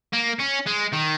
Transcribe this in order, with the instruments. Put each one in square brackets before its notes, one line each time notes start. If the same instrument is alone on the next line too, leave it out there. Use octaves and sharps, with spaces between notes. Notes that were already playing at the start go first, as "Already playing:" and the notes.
[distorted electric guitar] A#3
C#4
G#3
D#3